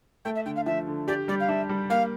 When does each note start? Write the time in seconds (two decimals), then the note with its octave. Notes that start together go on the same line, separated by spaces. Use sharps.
0.25 A3 G5
0.36 E5
0.46 D3 G5
0.56 F5
0.66 F3 E5
0.87 D3
1.08 G4 D5
1.28 G3 D5
1.40 F5
1.49 D4 E5
1.69 G3
1.90 A#3 F5